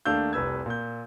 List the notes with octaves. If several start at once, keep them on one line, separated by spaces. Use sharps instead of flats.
D#2 A3 D4 F5 E6 G6
F1 C2 B4 E6 G#6
A#2 G6